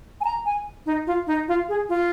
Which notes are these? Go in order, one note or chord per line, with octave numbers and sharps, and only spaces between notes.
G#5
A#5
G#5
D#4
F4
D#4
F4
G#4
F4